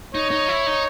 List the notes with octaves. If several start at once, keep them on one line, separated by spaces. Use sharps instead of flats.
D#4 C#5
D#4
E4
D#4